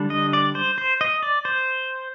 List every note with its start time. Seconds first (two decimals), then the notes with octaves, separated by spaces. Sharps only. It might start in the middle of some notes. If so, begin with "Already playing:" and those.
Already playing: D3 G3 D4
0.10 D#5
0.33 D5
0.55 C5
0.78 C5
1.01 D#5
1.23 D5
1.45 C5